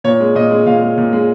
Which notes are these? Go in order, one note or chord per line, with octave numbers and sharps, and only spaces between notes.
A#2 C#5
G#3
A#2 D#5
G#3
A#2 F5
G#3
A#2
G#3